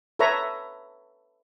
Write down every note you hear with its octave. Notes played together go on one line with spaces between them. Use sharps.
A4 B4 C#5 E5 A#5